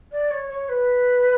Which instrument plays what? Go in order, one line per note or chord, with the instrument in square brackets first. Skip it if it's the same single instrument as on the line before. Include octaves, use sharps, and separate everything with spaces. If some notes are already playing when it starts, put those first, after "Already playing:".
[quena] D5
C#5
C#5
B4